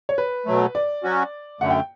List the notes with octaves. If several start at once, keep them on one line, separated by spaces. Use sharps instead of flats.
C#5
B4
B2 F#3 A3
D5
F#3 C#4 F#4
F#2 D3 A3 F#5
G5